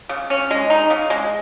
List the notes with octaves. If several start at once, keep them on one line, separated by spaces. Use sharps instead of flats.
C#3
C#4
G#3
D#4
C#3
G#3